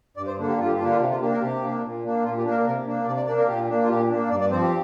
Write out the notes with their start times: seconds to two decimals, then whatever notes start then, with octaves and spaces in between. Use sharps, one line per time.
0.17 G2 D5
0.27 C5
0.38 D3 A#3 D4
0.49 G4
0.58 G2 F4
0.66 G4
0.75 F4
0.79 D3 A#3 D4 G4
0.91 F4
0.99 C3 G4
1.11 F4
1.21 A#3 D4 G4
1.31 A#4
1.41 C3 G4
1.61 A#3 D4
1.83 A#2
2.04 A#3 D4
2.23 A#2 F4
2.38 G4
2.45 A#3 D4
2.51 A#4
2.65 C3 A#4
2.86 A#3 D4
3.06 C3 D5
3.16 D5
3.27 A#3 D4 D5
3.38 A#4
3.48 A#2 G4
3.68 A#3 D4
3.84 F4
3.89 A#2 G4
4.09 A#3 D4
4.30 G2 D5
4.41 D5
4.50 F3 C4 C5
4.62 G4